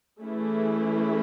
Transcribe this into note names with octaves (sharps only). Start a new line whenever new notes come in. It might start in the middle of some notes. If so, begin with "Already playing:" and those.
E3 A3 C#4 E4 G#4